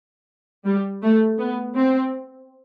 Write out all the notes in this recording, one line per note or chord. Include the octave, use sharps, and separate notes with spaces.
G3
A3
B3
C4